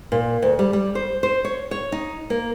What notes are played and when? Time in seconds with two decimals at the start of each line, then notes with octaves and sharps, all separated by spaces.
0.12 A#2
0.42 D2
0.59 G3
0.73 G3
0.95 C5
1.23 C5
1.45 C#5
1.71 C#5
1.92 D#4
2.30 A#3